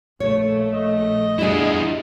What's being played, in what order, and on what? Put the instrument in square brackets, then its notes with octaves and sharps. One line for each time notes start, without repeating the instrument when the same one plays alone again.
[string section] A#1 A3 [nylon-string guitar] C#5
[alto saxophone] D#5
[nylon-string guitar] G3 D4 F4 [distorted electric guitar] E4 G#4